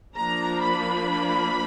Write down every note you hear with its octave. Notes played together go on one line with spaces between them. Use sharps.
F3 A#3 D4 A#5
B5